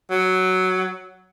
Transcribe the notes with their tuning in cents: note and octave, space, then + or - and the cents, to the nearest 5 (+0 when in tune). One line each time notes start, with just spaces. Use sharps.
F#3 +5